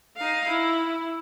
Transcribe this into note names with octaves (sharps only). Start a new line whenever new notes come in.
D#4 F5
E4